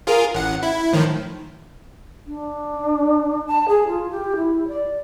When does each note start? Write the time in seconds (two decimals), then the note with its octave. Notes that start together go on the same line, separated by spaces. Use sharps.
0.07 F4 G#4 A#4
0.34 A1 F#5
0.63 E4
0.93 A2 D#3 F3
2.26 D4
3.47 A5
3.68 G#4
3.88 F4
4.11 G4
4.36 E4
4.68 D5